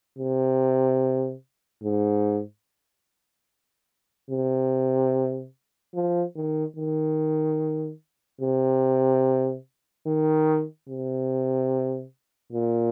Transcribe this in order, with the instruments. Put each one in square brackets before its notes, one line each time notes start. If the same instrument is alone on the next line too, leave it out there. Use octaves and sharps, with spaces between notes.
[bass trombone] C3
G#2
C3
F3
D#3
D#3
C3
D#3
C3
A#2